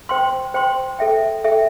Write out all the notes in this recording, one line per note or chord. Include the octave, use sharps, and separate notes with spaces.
C5 G5 C6
C5 G5 C6
A4 E5 G5
A4 E5 G5